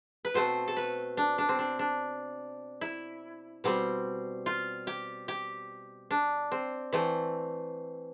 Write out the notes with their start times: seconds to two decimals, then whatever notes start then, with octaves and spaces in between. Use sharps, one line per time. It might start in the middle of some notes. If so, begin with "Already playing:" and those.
0.25 B4
0.34 B2 A3 C4 C5
0.68 A4
0.76 B4
1.17 D4
1.38 D4
1.49 C4
1.59 D4
1.79 D4
2.81 E4
3.64 B2 G3 C4
4.46 F4
4.87 G4
5.28 G4
6.11 D4
6.52 C4
6.93 E3 A3 C4